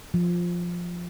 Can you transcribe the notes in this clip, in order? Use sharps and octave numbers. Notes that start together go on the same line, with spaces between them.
F3